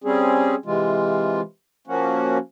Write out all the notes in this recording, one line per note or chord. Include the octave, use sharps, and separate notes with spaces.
G3 C4 C#4 G#4
C3 E3 G#3 F4
F3 A#3 C#4 F#4